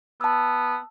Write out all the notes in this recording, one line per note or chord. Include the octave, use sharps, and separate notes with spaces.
B3 A5 E6